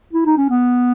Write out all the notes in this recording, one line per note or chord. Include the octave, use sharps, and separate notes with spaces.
E4
D#4
C#4
B3